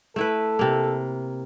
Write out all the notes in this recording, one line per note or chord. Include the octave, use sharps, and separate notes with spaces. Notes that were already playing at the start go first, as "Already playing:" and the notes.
A3 E4 A4 B4
C3 A#3